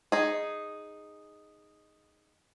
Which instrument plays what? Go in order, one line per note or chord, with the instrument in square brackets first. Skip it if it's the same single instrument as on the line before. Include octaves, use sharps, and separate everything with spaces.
[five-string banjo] D#4 G#4